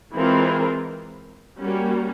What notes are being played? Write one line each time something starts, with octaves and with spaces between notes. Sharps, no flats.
E3 G#3 C4 F4 A#4
G3 A#3 C#4 F#4